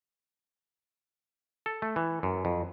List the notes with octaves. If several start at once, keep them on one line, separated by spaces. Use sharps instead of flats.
A4
A3
E3
F#2
F2